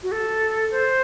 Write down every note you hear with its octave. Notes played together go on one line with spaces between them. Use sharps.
F#4
A4
C5